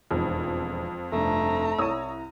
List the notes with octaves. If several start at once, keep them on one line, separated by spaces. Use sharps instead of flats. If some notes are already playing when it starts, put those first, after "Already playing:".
E1 F2 G#2
F1 G2 A3 A#5
C2 E4 C#5 D#6 E6 D#7